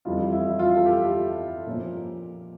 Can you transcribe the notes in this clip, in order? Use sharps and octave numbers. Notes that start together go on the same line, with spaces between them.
F2 E3 G3 F4
E4
F4
A4
G4
A#2 F3 A#3 C#4